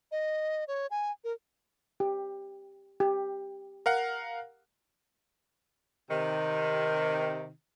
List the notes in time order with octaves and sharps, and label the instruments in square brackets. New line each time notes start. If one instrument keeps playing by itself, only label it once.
[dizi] D#5
C#5
G#5
A#4
[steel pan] G4
G4
[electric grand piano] A#4 F5 F#5
[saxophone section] C3 D#3